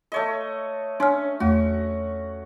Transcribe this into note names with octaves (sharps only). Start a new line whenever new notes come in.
A3 C#5 D#5
C#4 D4 F6
E2 A3 F#4